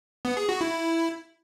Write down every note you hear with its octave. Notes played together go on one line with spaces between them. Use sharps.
B3
G#4
F#4
E4